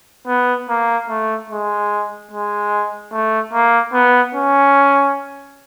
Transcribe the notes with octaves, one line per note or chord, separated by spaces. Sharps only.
B3
A#3
A3
G#3
G#3
A3
A#3
B3
C#4